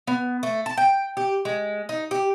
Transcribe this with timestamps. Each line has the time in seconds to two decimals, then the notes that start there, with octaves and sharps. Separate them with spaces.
0.07 B3
0.43 A3
0.66 A5
0.77 G5
1.17 G4
1.45 G#3
1.89 D#4
2.11 G4